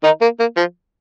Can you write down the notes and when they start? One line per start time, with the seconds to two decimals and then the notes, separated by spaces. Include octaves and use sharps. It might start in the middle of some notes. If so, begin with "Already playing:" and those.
0.03 D#3 D#4
0.21 A#3
0.40 A#3
0.57 F3